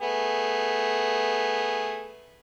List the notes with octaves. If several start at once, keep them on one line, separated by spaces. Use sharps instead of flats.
A3 B3 G#4